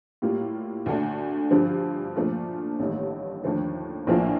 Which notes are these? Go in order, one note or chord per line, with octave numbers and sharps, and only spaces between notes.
A2 G3 A#3 F4
D2 D3 A3 D4
G2 D3 F3
A#2 F3 A3 D4 F4
A1 G2 D#3 A3
D#2 D3 F3 A3
A#1 A2 F3 A#3 F4